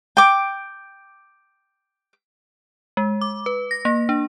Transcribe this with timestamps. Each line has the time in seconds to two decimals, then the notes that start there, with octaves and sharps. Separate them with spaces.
0.17 G5 D6
2.97 G#3
3.21 D6
3.46 B4
3.71 A#6
3.85 A#3
4.09 D4